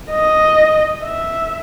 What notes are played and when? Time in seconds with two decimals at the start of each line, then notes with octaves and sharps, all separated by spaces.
0.10 D#5
1.04 E5